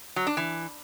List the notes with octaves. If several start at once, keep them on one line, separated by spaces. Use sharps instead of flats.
F#3
D4
E3